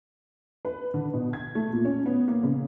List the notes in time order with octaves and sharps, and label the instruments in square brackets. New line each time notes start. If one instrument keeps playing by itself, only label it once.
[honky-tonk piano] B4
D3
B2
G#6
A3
A#2
C#4
B3
A#3
C#3